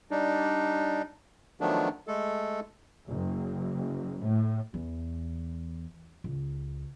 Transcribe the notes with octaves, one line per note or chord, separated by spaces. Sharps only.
G3 D4 D#4
D#3 F3 F#3 A3 B3 D4
G#3 A3 A4
F#1
A2
E2
C#2